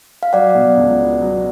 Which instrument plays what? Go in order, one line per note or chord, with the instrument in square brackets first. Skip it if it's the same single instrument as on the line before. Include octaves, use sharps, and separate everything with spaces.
[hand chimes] F5
[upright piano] F#3 [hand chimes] D5 F#5
[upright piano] B2
C#2
B3
F#3